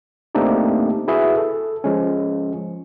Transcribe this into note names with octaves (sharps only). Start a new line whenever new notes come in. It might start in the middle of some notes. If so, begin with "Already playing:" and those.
A3 A#3 C4 D4 D#4 G4
E4 F#4 G#4 B4 E5
A4
F3 G#3 C#4